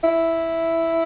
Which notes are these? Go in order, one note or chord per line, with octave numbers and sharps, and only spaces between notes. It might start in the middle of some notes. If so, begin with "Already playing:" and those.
E4